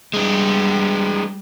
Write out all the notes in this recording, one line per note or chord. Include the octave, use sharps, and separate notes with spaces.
G3 G#3 D4